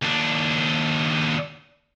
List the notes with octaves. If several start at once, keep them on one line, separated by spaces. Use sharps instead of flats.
D#2 D4